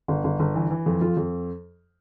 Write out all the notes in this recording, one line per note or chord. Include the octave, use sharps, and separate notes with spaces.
G1
G1
G1
E3
E3
F2
F2 F4
F2